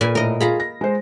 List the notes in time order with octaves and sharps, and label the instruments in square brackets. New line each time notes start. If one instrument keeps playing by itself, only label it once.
[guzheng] A#2 B4 G#5
[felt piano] A2 [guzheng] A#4 D#5
[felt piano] F4 G#4 [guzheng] F5 A#5 B5
[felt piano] A#6
G#3 C5